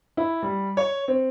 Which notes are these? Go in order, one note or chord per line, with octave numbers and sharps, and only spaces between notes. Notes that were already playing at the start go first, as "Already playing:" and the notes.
E4
G3
C#5
C4